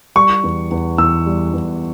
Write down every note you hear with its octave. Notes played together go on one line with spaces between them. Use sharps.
G3 C#6
E2
E2
E2 E6
G3
E2